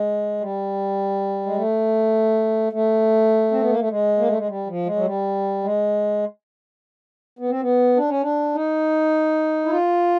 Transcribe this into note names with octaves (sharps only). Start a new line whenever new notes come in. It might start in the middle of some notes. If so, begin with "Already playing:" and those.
Already playing: G#3
G3
G#3
A3
A3
C4
B3
A#3
A3
G#3
A#3
A3
G#3
G3
F3
G#3
F#3
G3
G#3
B3
C4
B3
D4
C#4
D4
D#4
E4
F4